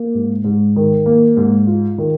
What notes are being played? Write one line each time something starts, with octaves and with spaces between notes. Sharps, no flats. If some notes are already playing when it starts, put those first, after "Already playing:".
Already playing: A#3
G#2
G#2
D#3
A#3
G#2
F4
D#3